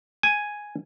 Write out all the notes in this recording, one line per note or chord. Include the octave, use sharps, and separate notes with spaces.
G#5